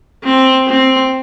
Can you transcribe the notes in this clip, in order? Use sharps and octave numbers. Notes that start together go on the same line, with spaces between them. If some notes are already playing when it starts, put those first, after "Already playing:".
C4
C4